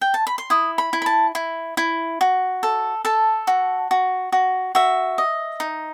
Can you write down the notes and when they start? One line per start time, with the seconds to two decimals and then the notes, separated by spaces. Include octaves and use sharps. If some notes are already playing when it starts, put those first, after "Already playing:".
0.01 G5
0.14 A5
0.27 B5
0.38 C6
0.50 E4 D#6
0.78 B5
0.93 E4
1.02 B5
1.06 A5
1.35 E4
1.77 E4
2.21 F#4
2.63 A4
3.05 A4 A5
3.47 F#4
3.91 F#4
4.32 F#4
4.75 F#4 E5
5.18 D#5
5.60 D#4